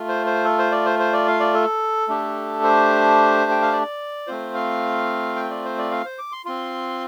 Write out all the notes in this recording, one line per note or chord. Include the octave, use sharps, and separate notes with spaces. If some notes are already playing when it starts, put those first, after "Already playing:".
Already playing: A3 F4
C5
C5
A4
C5
D5
C5
C5
D5
F5
D5
A4
A3 D4 G4
C5
G5
F5
D5
A3 C4 F4 C5
F5
G5
D5
C5
D5
F5
C5
D6
C6
C4 F4 C6